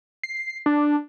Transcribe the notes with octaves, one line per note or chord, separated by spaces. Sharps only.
C7
D4